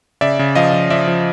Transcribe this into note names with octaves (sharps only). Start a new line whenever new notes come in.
C#3 D5 E5
C#3
F3 D#5 F5
F3
F3 D5 E5
F3